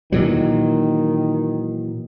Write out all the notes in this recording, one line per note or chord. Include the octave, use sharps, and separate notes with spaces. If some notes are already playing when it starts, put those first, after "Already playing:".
A#2 D#3 E3 F#3